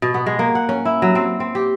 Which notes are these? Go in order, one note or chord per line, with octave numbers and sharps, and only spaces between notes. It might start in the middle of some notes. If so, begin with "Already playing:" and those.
B2
B3
G#3
A#3
F#5
C#4
E4
F#3
C4
C4
G4